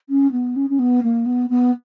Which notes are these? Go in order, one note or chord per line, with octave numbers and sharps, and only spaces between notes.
C#4
B3
C#4
C#4
B3
A#3
B3
B3